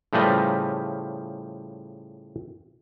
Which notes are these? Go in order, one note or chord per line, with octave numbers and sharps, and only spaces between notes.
A2 C#3 F3 G3 B4 D#5